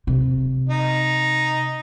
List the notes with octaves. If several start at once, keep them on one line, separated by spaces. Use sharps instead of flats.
C3
D#4